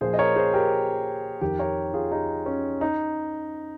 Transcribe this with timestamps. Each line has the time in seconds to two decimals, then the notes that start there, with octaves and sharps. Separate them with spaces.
0.01 A#2 F3 G#4 C5
0.14 D#5
0.19 A#4 C#5
0.36 G#4 C5
0.54 G4 A#4
1.41 F2 D#3 G4 A#4
1.59 A#4 C#5
1.94 F4 G#4
2.12 D#4 G4
2.46 C#4
2.81 D#4